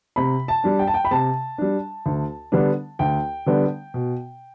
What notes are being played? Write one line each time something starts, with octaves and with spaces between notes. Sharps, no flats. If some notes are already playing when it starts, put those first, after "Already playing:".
C3 B5
A5
G3 D4
G5
A5
G5
B5
C3 A5
G3 D4
D2
D3 G3 B3 D4
D2 G5
D3 G3 B3 D4
B2